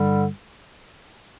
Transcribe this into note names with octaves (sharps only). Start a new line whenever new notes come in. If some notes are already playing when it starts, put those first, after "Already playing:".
Already playing: G2 D3 G3